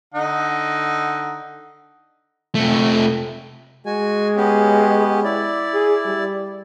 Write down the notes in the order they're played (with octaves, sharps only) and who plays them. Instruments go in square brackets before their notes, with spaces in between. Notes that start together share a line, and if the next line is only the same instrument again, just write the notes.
[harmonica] D3 D#4 F#5
[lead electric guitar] C3 A3
[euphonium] G#3 [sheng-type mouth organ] F#4 G#5
[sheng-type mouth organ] B3 C#4 G4
E4 D5
[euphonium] G#4
G3